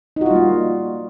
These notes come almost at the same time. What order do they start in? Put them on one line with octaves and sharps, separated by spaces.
D#4 F#4 F4 G3 A#3